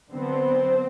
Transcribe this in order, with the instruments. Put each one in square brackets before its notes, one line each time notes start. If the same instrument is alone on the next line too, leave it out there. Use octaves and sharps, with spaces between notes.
[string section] D3 F#3 B3 C4 C5